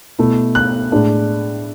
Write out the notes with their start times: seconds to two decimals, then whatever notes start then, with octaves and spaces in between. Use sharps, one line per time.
0.19 B2 A3 E4
0.55 F#6
0.92 A2 G#3 D4